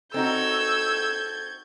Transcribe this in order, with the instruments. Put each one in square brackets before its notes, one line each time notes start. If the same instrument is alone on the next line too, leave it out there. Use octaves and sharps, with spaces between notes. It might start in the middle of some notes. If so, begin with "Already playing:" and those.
[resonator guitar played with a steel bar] C4 D#4 F#4 [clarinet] A4 [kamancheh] E6 [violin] G6 G#6